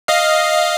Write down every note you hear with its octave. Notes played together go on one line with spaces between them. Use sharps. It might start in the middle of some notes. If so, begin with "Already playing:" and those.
D#5 F5